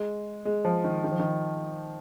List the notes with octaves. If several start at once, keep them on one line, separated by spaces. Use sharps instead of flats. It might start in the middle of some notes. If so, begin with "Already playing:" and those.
Already playing: G#3
G#3
F3
D#3
D#3
F3
D#3